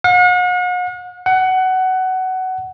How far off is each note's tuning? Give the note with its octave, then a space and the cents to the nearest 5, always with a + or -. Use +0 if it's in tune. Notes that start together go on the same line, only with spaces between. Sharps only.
F#5 -40
F#5 +20